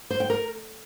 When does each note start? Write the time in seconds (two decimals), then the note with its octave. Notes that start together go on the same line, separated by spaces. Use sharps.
0.10 C5
0.20 G5
0.30 A#4